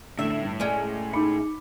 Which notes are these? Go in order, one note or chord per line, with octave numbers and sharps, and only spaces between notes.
A2 D3 A3 E5
G2
G#3 A3 C#4 D5 C#7
D#4 B5 D6 C#7